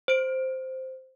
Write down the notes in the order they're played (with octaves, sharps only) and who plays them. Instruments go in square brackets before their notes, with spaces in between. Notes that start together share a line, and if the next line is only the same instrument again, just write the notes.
[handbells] C5 D7